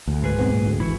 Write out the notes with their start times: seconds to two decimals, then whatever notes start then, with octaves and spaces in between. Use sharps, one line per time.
0.08 D2
0.22 G#2 G#4 B4
0.38 B1 B3 C4
0.51 A#2
0.66 D2
0.80 G#1 E3 E4 F#4